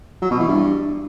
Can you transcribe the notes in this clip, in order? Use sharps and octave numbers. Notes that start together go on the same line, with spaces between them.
F#3
B2
E3
G2